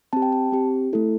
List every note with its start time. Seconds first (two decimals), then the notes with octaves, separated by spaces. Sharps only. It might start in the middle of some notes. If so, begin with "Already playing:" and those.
0.13 C4 G4 A5
0.22 G5
0.32 A5
0.52 C4 G4
0.93 A3 E4 A4